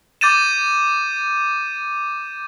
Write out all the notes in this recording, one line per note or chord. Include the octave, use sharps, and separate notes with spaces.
D6 G6 A6 D#7 E7